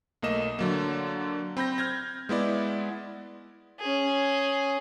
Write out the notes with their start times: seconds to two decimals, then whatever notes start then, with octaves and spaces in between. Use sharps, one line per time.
0.23 B1 A3 A#3 D#5 E7
0.59 D3 F#3 A#3
1.57 C4 B5 G6 A#6
1.78 F6 G6 G#6 A#6
2.29 G#3 B3 E4 D5
3.80 C#4 G#4